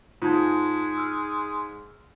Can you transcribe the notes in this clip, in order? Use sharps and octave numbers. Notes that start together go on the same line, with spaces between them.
G#2 G#3 F4 A5 G#6
E6 F6